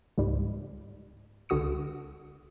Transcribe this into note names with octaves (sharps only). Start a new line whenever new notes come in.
C#2 G#2 G3
C#2 D3 F#4 D#6 C#7